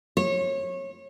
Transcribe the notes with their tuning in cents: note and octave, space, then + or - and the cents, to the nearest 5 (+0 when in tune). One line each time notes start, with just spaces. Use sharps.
C#5 -25